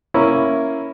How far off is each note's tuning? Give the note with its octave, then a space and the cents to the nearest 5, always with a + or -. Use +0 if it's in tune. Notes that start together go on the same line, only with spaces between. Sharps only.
A#3 +0 C#4 +0 E4 +0